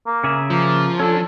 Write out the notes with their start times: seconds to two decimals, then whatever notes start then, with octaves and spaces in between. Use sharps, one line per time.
0.07 A#3
0.24 C#3 G#4 E5
0.50 F3 A#3
1.00 C#4 D4 A4